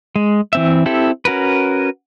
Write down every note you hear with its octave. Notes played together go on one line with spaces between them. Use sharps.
G#3
E3 C4 E5
C4 E4 G4 A4
C#4 F#4 A#4 B4